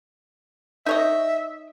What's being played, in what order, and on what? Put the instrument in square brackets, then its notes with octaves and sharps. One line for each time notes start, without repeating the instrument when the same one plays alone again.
[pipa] D#4 C#5 D#5 [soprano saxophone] E5